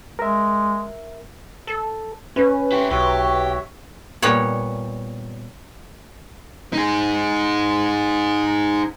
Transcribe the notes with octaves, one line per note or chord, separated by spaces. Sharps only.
G#3 A#4 E5
A4
C#4 B4
E4 G4 C#6
B1 F#4 G4 C#5 E5
A#2 G3 B3 C#5
D#4 G#4